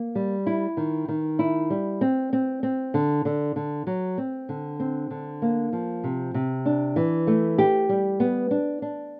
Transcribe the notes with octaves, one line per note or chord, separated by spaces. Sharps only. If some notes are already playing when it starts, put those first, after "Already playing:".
Already playing: A#3
G3
E4
D#3
D#3
E4
G3
C4
C4
C4
D3
D3
D3
F#3
C4
D3
C4
D3
A#3
F3
C3
C3
D4
E3
A3
G4
G3
B3
D4
D4